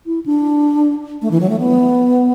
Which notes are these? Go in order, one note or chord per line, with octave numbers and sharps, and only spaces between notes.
E4
D4
A3
E3
F#3
A3
B3